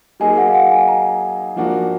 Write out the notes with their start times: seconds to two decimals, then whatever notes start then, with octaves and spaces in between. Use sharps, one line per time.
0.20 F#3 A#3 D#4 G#4 D#5 G#5
0.37 F#5
0.48 F5
0.54 F#5
0.71 G#5
0.88 A#5
1.56 F3 A#3 D4 F#4